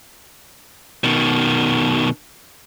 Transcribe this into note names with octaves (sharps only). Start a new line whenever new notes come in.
B2 D#3